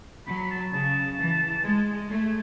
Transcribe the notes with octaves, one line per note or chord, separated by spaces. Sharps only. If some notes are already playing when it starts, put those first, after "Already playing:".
F#3 B5
A5
C#3 A5
E3
G#3 G#5
A3